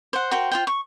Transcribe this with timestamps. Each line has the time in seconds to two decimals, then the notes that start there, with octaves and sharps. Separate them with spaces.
0.13 C5 F#5
0.31 F#4 A#4 C5 G5
0.52 F4 C5 G5
0.67 C#6